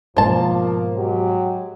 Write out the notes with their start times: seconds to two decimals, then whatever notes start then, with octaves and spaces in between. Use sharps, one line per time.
0.17 G#2 B2 F3 A#3 C5 A5
0.93 F#3 G#3 G4